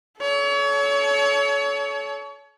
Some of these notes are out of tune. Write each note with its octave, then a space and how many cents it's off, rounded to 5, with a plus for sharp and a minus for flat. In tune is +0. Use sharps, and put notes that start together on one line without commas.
A4 -30 C#5 +30